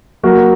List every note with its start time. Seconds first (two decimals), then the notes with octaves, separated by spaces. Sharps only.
0.23 F#3 A#3 F#4 A#4